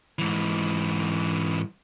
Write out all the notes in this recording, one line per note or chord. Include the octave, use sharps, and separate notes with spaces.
G#2 E3